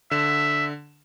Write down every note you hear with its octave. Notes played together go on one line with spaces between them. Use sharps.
D3 E5 E7